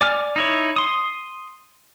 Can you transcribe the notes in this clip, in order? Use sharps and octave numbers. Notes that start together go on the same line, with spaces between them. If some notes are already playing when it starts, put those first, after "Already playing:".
D5 G#5 F6
D#4 E4 C#5
C6 D#6